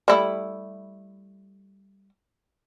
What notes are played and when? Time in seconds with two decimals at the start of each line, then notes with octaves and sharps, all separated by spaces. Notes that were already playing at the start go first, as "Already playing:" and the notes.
0.08 G3 A3 E4